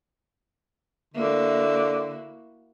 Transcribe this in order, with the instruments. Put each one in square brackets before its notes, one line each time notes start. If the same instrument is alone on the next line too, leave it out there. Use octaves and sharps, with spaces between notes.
[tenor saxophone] D3 [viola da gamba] A#3 E4 F#4